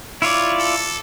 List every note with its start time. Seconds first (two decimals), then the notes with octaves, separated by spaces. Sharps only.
0.22 E4 F4 C#5 D5
0.59 A4